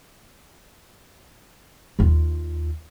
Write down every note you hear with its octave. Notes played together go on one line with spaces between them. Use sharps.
D#2 F4